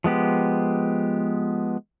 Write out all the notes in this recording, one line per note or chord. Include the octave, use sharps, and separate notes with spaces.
F3 G#3 B3 G4